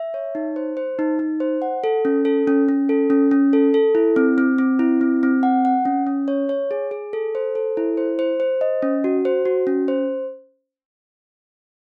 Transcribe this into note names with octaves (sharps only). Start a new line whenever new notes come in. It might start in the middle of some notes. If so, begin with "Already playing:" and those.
Already playing: E5
C#5
D#4
C5
C5
D#4
D#4
C5
F#5
A4
C#4
A4
C#4
C#4
A4
C#4
C#4
A4
A4
E4
C4
C4
C4
E4
C4
C4
F#5
F#5
C#4
C#4
C#5
C#5
G#4
G#4
A4
C5
A4
E4
C5
C5
C5
D#5
C#4
F#4
C5
F#4
C#4
C5